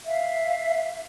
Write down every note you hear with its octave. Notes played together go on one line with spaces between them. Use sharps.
E5 F5